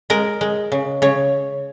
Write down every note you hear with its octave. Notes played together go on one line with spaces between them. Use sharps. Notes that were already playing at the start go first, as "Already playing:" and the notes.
G#3 A#4
G#3
C#3
C#3 C#5